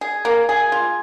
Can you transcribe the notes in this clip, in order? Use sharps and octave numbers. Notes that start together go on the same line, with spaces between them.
G#4
A#3
G#4
F4